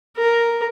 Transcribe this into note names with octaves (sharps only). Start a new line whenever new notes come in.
A#4